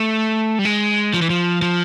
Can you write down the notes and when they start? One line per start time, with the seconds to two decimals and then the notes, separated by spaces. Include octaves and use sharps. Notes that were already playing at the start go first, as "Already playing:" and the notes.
Already playing: A3
0.59 G3
0.65 G#3
1.14 F3
1.22 E3
1.30 F3
1.62 F3